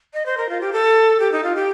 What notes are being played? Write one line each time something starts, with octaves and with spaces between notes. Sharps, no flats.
D#5
C5
A#4
F4
G4
A4
G4
D#4
F4
G4